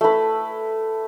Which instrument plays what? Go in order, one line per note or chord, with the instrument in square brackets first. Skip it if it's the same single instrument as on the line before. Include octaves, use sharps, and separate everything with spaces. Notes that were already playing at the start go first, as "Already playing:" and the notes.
[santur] A3 E4 B4